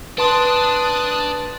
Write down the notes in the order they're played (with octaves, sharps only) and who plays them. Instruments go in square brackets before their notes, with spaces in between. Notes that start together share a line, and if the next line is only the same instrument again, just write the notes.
[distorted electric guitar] D4 [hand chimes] B4 A5 C6 [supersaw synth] D#6 F#6 A6